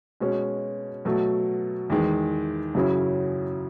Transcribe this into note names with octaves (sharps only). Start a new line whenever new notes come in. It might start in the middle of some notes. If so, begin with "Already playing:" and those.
B2 G#3 C#4
B2 F#3 A3
E2 D#3 G#3
F#2 C#3 F#3 C#4 E4